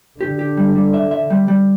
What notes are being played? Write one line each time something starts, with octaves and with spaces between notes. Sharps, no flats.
D3 G4
G4
G3
G3
E5
E5
G3
G3